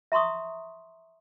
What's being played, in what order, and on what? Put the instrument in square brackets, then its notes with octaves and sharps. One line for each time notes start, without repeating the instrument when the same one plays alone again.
[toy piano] E5 A#5 C6 C#6 D#6